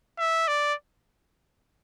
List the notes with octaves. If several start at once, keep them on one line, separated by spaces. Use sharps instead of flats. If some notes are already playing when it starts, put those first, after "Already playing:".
E5
D5